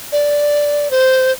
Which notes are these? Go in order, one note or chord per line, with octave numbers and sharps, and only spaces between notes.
D5
C5